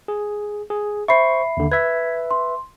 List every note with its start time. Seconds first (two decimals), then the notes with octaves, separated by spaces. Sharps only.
0.08 G#4
0.70 G#4
1.08 C5 E5 B5 C#6 C7
1.57 D#2 D3
1.72 B4 E5 G#6 B6
2.31 C6